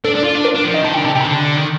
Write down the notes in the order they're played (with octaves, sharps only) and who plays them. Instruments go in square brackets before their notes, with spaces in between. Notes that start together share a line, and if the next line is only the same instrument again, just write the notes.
[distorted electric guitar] D4 [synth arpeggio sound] A4
[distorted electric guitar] D4
F4
D4
[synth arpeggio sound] A#4
[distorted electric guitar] D4
F3
[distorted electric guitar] D#3 [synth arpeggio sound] D#5
[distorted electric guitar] D#3 [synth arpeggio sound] A5
[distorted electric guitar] D3 [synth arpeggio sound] G5
[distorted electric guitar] C3 [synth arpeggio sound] A5
[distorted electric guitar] C3 [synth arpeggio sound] G5
[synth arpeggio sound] A#5
[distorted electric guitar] D3 [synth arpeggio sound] A5
[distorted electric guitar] D#3